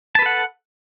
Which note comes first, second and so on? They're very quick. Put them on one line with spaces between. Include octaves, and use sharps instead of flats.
A5 B4 A4 F#5